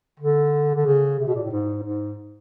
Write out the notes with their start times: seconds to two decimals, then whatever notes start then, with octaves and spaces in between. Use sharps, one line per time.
0.20 D3
0.75 D3
0.86 C#3
1.18 C3
1.27 B2
1.35 A#2
1.43 A2
1.51 G#2
1.84 G#2